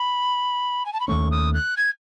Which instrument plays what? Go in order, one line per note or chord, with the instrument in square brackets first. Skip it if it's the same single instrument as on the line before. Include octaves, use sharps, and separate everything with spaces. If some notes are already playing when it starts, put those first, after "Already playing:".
Already playing: [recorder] B5
G#5
A5
B5
[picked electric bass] D#2 D#3 A3 C#4 [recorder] C#6
[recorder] D#6
F#6
G#6